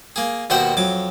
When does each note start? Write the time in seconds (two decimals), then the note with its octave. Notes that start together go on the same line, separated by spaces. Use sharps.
0.16 A#3 G#4
0.50 D#2 B2 F#4 C5 F#5 G5
0.77 F2 F#3 D6